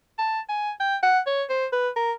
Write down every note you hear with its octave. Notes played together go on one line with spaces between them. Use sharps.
A5
G#5
G5
F#5
C#5
C5
B4
A#4